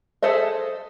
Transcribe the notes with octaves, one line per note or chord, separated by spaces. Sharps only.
G#4 A4 C5 D#5 E5